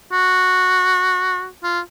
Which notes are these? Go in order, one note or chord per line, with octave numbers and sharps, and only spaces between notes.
F#4
F4